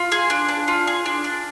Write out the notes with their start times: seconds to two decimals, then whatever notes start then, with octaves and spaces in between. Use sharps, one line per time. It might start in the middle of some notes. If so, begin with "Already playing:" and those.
Already playing: F4
0.12 G#4
0.30 D4
0.49 D4
0.68 F4
0.87 G#4
1.06 D4
1.24 D4